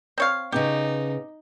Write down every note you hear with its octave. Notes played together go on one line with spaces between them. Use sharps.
C4 C#5 F5
C#3 B3 C#4 D#4 G4